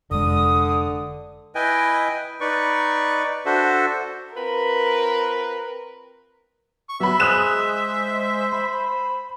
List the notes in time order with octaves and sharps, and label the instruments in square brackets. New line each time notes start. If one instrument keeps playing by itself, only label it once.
[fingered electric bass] F1 G#3 [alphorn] D3 [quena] D#6
[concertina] E4 B4 D#5 G5 G#5
D#4 B4 D5 C#6
D4 F#4 A4 C5 E5
[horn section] C4 F4 B4 [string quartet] A#4
[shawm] C#6
[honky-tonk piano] F#3 B5 [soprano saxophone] B3 [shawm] E5
[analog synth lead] G#3 [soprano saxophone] C5 [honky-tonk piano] D#6 F#6 E7
[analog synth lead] B5